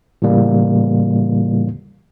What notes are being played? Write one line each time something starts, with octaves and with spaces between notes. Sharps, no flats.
A2 C#3 E3 G3 A#3